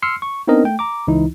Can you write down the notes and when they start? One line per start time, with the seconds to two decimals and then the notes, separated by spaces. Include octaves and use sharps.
0.02 C6 E6 F6 C7 C#7
0.22 C#6
0.47 B3 C4 D4 D#4 A#4 D#5
0.64 A3 G5
0.79 A#5 D6
1.07 C#2 E3 D#4 E4